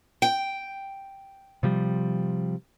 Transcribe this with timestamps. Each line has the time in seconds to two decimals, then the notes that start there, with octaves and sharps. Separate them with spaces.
0.22 G5
1.63 C3 F3 G3